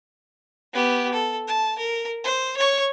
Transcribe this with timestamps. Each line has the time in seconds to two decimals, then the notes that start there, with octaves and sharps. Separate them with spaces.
0.73 B3 G4
1.13 A4
1.48 A5
1.78 A#4
2.24 C5
2.57 C#5 C#6